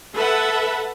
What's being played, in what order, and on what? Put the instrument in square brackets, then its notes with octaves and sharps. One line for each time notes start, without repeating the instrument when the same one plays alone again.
[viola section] A4 B4 E5 F#5